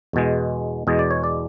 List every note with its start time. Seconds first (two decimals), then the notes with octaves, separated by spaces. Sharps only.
0.13 E2 B2 G#3
0.87 E2 B2 G#3 D#5
0.99 D5
1.11 C#5
1.24 D5